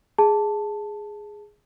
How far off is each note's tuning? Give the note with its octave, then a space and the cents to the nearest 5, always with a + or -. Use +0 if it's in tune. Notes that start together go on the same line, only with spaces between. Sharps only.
G#4 +0 A5 +0